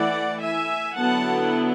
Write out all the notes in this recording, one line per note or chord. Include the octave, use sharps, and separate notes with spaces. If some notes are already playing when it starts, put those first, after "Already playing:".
Already playing: E3 A3 E4 D5 F#5
E5 G#5
D3 F#3 B3 E4 F#5 A5